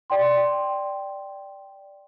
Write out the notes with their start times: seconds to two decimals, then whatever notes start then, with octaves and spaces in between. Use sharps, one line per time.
0.10 D5 G5 C6